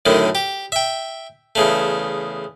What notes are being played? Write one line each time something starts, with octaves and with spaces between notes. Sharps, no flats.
F#2 A2 D3 D#3
G4
E5 G5
E2 C#3 A3